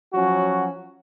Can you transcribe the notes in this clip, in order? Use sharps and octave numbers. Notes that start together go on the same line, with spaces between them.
F3 F#3 C#4 F#4